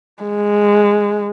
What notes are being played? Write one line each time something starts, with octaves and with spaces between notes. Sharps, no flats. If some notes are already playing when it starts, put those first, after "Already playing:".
G#3